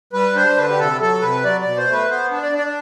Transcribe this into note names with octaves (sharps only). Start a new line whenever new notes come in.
G3 B4
D4 C5
D3 B4
G4
C3 A4
F#3 A4
C3 B4
F#3 D5
B2 D5
C5
A3
B4
B3 C5
D4
D5
D4
D5